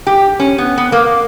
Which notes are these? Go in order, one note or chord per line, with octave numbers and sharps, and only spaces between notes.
G4
C#4
B3
B3
A#3